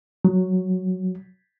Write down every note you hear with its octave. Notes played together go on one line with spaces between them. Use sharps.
F#3